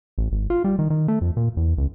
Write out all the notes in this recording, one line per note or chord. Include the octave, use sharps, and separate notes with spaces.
A1
G#1
F4
G3
D#3
D#3
A3
F2
A#2
E2
C#2